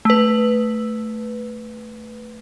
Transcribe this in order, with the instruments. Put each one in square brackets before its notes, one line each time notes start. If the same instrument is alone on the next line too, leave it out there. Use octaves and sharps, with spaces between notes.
[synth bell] A3 B4